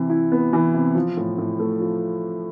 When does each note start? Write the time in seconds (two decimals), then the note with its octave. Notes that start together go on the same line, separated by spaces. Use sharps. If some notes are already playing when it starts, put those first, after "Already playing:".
Already playing: C3 E3
0.09 E4
0.32 B3
0.53 E3
0.74 C3
0.95 F3
1.17 A2
1.38 A2
1.59 A3
1.80 F3